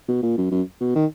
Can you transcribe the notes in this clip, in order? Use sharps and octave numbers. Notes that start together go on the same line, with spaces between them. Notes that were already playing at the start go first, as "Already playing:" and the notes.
B2
A#2
F#2
F#2
B2
D#3